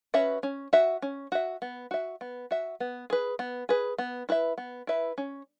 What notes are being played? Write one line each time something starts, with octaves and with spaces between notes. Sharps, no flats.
C#4 F#4 B4 E5
C#4
F#4 E5
C#4
F#4 E5
B3
F#4 E5
B3
F#4 E5
B3
G#4 B4
B3
G#4 B4
B3
E4 B4 E5
B3
E4 B4 E5
C#4